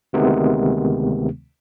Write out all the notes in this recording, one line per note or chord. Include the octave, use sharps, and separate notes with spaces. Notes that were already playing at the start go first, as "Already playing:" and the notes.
D2 C3 D#3 G#3 B3